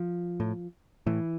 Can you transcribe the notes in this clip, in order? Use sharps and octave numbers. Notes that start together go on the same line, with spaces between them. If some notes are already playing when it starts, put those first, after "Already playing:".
Already playing: F3
A2
A2 E3